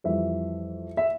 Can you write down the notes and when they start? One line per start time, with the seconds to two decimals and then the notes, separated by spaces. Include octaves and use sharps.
0.04 F2 E3 G3 E5
0.97 E5